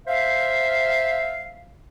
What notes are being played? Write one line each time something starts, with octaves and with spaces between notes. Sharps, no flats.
C5 E5 F5